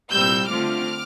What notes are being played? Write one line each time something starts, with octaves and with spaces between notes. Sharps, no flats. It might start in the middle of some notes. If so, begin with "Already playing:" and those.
C2 A#2 G3 C4 E6 G6
D3 A3 C4 F4 D6 F6